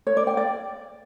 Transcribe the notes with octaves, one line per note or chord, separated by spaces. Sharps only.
C#5
D5
G5
D5